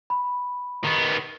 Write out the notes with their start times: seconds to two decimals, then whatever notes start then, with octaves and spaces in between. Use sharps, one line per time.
0.10 B5
0.84 D#3 B3